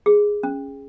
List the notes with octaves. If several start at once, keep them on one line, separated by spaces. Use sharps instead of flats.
G#4
C#4